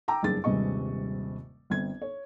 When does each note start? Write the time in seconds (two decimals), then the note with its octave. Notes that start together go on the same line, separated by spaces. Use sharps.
0.08 G5 A#5 D6 E6
0.23 F#1 G2 D4 G#4 A6
0.44 D#1 G2 C3 G#3 D#5 C#6
1.70 G1 C4 G#6
2.02 C#5